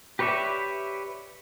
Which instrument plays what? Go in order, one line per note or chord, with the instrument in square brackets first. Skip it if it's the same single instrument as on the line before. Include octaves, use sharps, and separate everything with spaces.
[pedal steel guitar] G4 B4 C#5 D5 E5